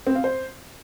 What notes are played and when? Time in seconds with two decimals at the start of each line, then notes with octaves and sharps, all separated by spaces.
0.07 C4
0.15 F5
0.24 C5